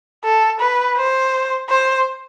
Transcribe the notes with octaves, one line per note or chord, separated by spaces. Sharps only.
A4
B4
C5
C5